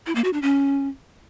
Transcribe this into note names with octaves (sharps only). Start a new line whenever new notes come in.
E4
A#3
F#4
D4
C#4